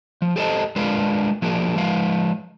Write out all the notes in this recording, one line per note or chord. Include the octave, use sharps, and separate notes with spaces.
F3
G4 A4 C5 C#5 D#5 A5
G#3 D4 F4 A#4 B4 F5
F3 A#3 D4 F#4 G#4 A#4
F3 G#3 B4 F5